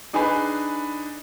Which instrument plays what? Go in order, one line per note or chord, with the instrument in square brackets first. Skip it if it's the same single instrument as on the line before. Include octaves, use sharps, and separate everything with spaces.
[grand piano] D4 D#4 G#4 B4 G#5 B5